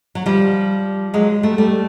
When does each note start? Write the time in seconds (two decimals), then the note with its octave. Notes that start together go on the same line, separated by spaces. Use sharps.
0.15 F#3
0.26 F3 G3
1.14 F#3 G#3
1.43 G3 A3
1.58 G3 A3